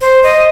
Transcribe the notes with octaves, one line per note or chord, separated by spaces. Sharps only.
C5
D#5